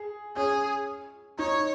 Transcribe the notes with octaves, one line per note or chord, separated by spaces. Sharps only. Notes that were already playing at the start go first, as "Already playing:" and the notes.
Already playing: G#4
C#4 G#4
D#4 C#5